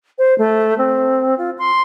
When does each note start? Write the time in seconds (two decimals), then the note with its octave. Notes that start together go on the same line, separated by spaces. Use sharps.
0.18 C5
0.38 A3
0.78 C4
1.38 F4
1.58 C6